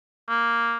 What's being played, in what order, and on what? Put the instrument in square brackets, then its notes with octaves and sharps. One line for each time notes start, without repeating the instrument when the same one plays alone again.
[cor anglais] A#3